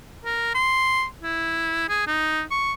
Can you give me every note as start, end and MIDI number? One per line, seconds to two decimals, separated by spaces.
0.25 0.51 70
0.54 1.05 84
1.22 1.88 64
1.89 2.05 68
2.07 2.43 63
2.51 2.73 85